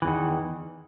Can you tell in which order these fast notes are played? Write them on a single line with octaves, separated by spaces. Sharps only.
E3 E2 D#3